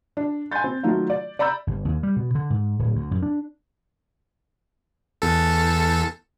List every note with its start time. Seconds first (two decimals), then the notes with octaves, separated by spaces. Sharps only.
0.17 D4
0.52 G#5 B5 C6 G6 A6
0.64 C4
0.83 D#3 F#3 A3 D#4 F4
1.10 D5
1.39 D5 A#5 B5 E6 G6
1.67 G1
1.85 D#2
2.03 G3
2.16 B2
2.35 D3
2.50 G#2
2.79 D1
2.95 D2
3.11 F#2
3.23 D4
5.22 E2 A4